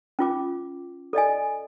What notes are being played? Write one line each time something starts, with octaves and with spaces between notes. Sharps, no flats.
C#4 F4 D6
A4 D5 D#5 G#5